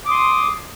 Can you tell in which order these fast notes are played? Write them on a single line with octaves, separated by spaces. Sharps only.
D6 D#6 C6